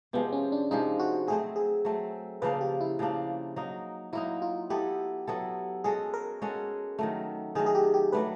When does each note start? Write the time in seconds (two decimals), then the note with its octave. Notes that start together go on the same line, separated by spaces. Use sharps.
0.13 C3 F3 G#3 B3
0.32 C#4
0.52 D4
0.71 C3 F3 G#3 D#4
0.99 F#4
1.27 F#3 A3 C4 G#4
1.56 G#4
1.85 F#3 A3 C4
2.42 C#3 F3 A#3 D4 B4
2.61 G4
2.81 E4
2.99 C#3 F3 A#3 D4
3.56 F#3 A#3 D#4
4.13 F#3 A#3 D#4 E4
4.42 F4
4.70 F#3 B3 E4 G4 A4
5.27 F#3 B3 E4 A4
5.84 G#3 C#4 F#4 G#4 A4
6.14 A#4
6.42 G#3 C#4 F#4 A4
6.99 D#3 F#3 A3
7.55 D#3 F#3 A3 G#4
7.66 G#4
7.75 G4
7.94 G4
8.12 F#3 A3 D4 B4